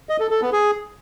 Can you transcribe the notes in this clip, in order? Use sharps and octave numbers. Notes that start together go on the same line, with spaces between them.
D#5
A4
A4
B3
G#4